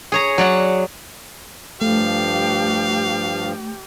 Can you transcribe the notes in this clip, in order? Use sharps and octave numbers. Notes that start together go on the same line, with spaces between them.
G#4 C#5 A#5
F#3 D5 F#5
G2 F3 A3 G4 F5